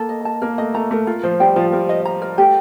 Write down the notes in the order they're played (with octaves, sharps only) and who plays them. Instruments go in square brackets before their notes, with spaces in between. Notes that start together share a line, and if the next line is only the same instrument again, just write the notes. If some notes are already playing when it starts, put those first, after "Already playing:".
Already playing: [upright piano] A#3 [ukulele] A4
[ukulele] D#5
A5
[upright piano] A#3 [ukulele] A#4
[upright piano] A3 [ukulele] D#5
[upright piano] A3 [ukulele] A#5
[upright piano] A3 [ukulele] A#4
[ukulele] F4
[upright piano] F3 [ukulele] C5
[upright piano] G3 [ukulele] G5
[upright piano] F3 [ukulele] F4
[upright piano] G3 [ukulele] A#4
[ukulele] D#5
A#5
A#4
[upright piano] A3 [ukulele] G4